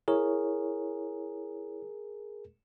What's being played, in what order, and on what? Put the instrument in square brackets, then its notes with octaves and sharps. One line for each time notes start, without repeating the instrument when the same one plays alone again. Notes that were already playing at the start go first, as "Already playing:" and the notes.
[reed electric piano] E4 C#5 [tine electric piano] G#4 A#4